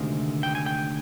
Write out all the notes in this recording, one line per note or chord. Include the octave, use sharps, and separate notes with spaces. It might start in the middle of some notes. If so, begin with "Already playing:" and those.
Already playing: D2 C3 D#3 G#3
G5
G#5
G5